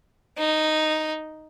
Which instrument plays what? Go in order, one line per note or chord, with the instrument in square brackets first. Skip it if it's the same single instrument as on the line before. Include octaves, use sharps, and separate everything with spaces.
[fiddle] D#4